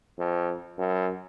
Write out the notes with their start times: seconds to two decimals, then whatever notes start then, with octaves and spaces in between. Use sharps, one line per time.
0.19 F2
0.78 F#2